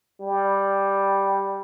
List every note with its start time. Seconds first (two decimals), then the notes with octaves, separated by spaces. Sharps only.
0.20 G3